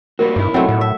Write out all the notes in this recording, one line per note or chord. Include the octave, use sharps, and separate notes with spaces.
G3 A#3 F#4 A#4
B1 G2 E4
F#3 A3 C4 D#5
A2
E5